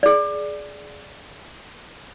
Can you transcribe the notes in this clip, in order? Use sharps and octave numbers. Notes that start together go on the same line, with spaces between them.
G#4 D5